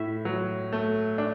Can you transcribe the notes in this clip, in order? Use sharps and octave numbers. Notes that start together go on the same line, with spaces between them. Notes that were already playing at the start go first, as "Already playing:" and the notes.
Already playing: A2 E4 E5
F#3
A3
D4